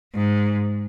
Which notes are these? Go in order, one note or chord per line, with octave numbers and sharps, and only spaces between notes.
G#2